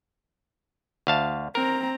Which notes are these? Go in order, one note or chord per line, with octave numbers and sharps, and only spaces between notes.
D2 F5 A5
C4 A#4 A#5